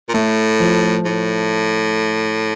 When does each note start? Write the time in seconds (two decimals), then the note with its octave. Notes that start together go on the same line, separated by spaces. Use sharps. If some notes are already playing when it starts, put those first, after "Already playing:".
0.08 A#2
0.14 A2 A3
0.60 F3
1.05 A2